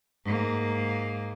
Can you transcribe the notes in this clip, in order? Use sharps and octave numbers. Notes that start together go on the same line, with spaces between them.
G#2 A#3